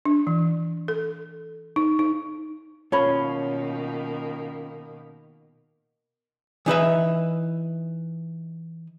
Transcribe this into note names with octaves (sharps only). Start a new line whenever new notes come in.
D4
E3
A4
D#4
D#4
B2 D#3 A#3 C#4 F4 C#5 A5 B5
E3 D#4 B4 E5